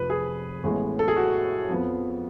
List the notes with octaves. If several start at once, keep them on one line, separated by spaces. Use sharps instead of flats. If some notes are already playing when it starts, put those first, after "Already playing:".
Already playing: F1 F2 F3 B4
G#4
A1 A2 G#3 B3
A4
G#4
F#4
F2 F3 B3